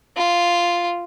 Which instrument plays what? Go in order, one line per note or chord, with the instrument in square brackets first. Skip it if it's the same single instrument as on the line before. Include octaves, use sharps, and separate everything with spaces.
[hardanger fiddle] F4